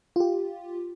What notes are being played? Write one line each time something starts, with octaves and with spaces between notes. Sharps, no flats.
F4 G4